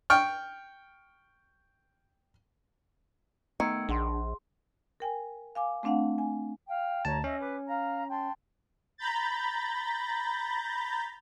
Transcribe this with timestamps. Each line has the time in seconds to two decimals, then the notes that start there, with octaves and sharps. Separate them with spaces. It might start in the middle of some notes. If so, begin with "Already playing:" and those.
0.10 G5 C#6 F6
3.60 D#3 A3 B3 E6 G#6 C#7
3.89 A#1 D4 G#4 F#5 C6
5.00 A#4 G5 G#5
5.55 F5 G#5 D6
5.83 A3 C4 D4 F5 F#5
6.18 G#5
6.67 F5 G5
7.05 D2 C#5 A5 A#5
7.24 C#4 D#5 E5
7.38 B4 D6
7.66 F5 A#5
8.09 G5 A5 C6
8.98 A#5 B5 G6 A6